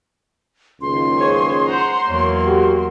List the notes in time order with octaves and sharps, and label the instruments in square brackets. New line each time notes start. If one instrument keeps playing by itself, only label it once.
[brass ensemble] F#1 C#2 D#3 [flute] C6
[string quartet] G#4 C5 C#5
C5 F#5 A#5
[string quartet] E2 F#3 A#3 [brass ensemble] C#5
[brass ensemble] F#4 G4